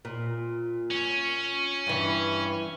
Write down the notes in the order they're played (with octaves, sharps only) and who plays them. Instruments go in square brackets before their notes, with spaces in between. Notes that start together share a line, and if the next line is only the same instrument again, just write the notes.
[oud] A#2
[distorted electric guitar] C#4
[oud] G2 E3